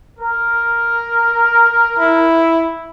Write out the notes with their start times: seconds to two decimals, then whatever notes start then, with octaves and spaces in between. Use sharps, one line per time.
0.18 A#4
1.99 E4